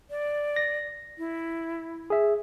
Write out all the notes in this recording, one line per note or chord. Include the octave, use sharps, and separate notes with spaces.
D5
A#6
E4
G#4 E5